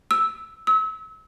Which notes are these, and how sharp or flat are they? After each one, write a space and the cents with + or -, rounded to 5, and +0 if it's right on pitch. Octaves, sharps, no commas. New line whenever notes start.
E6 -5
E6 -35